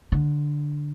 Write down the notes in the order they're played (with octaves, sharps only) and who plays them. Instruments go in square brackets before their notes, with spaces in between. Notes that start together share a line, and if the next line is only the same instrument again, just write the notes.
[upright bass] D3